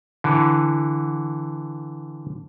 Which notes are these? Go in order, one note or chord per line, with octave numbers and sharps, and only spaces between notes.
D3 E3